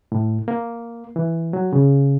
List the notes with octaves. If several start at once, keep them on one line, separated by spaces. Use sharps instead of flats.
A2
A#3
E3
F#3
C#3